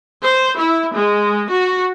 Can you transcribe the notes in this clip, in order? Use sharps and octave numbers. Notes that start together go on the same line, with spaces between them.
C5
E4
G#3
F#4